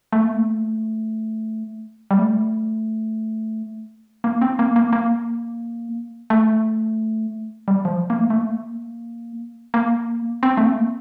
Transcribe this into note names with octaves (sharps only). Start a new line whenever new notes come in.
A3
A#3
A3
G3
A3
A#3
C4
A#3
A#3
A#3
A3
G3
F3
A#3
A3
A3
A#3
A#3
C4
A3
A#3